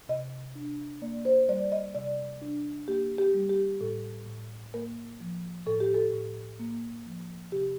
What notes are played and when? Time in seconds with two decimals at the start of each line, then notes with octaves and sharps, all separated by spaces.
0.09 C3 D#5
0.55 D4
1.02 A#3 D5
1.25 C5
1.49 G3 D5
1.72 D#5
1.95 C3 D5
2.42 D4
2.88 A#3 G4
3.18 G4
3.34 G3
3.50 G4
3.81 A2 A4
4.27 A2
4.74 A#3 A#4
5.20 F3
5.66 A2 A4
5.80 G4
5.94 A4
6.13 A2
6.59 A#3
7.06 F3
7.52 C3 G4